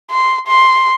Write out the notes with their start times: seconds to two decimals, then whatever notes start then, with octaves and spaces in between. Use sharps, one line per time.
0.11 C6
0.47 C6